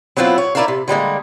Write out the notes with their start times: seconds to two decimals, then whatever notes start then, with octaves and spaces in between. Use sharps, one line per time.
0.16 F#3 B3 C4 E4 F4
0.38 C#5
0.55 E4 F4 A#4 D5 E5 F5
0.68 C3
0.88 D3 G3 G#3 A#3